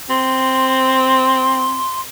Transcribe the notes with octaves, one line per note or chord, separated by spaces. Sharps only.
C4 C6